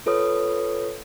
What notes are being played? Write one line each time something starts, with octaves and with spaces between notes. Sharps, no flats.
F4 A4 B4 C#5 D#6